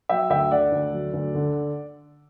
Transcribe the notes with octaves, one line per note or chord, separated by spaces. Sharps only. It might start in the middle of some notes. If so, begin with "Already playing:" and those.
F#3 E5 G5
D2 E5 G5
D3 D5 F#5
D2
F#3
D2
D3